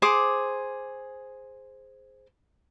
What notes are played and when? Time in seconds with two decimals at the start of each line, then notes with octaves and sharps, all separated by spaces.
0.02 G#4 C5 D6